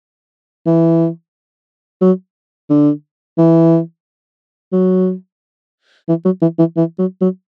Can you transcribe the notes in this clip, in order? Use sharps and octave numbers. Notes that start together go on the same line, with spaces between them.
E3
F#3
D3
E3
F#3
E3
F#3
E3
E3
E3
F#3
F#3